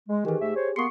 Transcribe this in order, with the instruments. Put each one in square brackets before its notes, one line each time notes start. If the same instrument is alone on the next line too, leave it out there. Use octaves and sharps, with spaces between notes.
[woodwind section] G#3
[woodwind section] D#3 E3 [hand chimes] G4 G#4
[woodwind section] G#2 A3 E5
C5 C#5
[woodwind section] A#3 B3 C6 [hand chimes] C#6 C#7